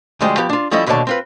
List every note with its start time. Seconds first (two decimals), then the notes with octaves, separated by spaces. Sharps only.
0.21 D2 F3 G3 G#3 G#4 G5
0.37 F3 B3 G4
0.49 D4 F4
0.71 F3 G3 C#4 E4 A4 D#5
0.86 D#2 B2 D3 C#5 D5 A5
1.07 C4 F4 B4